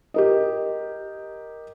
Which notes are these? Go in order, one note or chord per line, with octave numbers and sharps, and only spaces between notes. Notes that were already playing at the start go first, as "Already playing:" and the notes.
G4 A#4 D#5